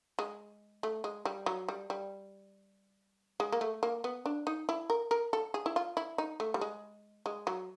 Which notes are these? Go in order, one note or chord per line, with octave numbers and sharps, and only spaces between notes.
G#3
A3
G#3
G3
F#3
G3
G3
G#3
A#3
A3
A#3
B3
D4
D#4
E4
A#4
A#4
A4
G#4
E4
F4
E4
D#4
A3
G3
G#3
G#3
F#3